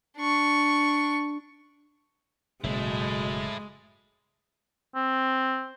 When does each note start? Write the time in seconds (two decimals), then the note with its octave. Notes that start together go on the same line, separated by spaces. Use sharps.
0.18 D4 C#6
2.64 F#1 B2 G#3 A3 E4
4.95 C4